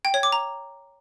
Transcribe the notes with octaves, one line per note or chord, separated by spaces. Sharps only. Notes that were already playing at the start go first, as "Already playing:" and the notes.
G5
C#5
D6
A#5